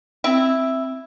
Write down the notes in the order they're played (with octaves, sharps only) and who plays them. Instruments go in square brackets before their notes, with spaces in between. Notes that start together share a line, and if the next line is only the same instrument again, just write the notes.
[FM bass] C4 [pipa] E4